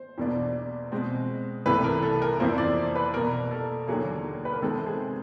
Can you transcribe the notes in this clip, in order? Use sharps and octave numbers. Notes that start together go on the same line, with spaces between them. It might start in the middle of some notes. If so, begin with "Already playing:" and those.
Already playing: C5
E2 B2 G3 A#3 D4
B2 G#3 C4
C2 C3 E3 A3 B4
A#4
A4
A#4
F2 C3 E3 G3 A#3 C5
D5
B4
B2 G3 A#3 A#4
A4
D#2 D3 F#3 A#3 G#4
B4
A#4
C3 D#3 G#3 C4 A4
G#4